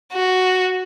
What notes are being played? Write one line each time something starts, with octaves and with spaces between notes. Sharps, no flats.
F#4